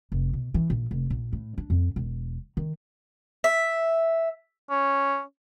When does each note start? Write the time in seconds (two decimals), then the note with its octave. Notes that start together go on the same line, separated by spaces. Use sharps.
0.12 F1
0.33 B2
0.54 E3
0.70 A#1
0.91 F1
1.10 A#1
1.33 A2
1.58 D4
1.70 F2
1.96 E1
2.57 D#3
3.44 E5
4.70 C#4